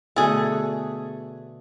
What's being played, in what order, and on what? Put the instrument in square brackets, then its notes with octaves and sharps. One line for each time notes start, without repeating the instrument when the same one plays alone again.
[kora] B2 D3 A3 [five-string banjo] G#4 A4